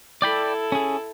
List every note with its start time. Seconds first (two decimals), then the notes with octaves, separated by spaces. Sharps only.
0.22 E4 A4 D5 G5 B5
0.72 C#4 G#4